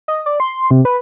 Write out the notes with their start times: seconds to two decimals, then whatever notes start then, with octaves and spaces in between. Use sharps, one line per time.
0.08 D#5
0.26 D5
0.40 C6
0.71 C3
0.85 B4